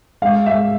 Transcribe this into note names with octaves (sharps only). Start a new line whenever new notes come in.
G#3 F5
G#3 E5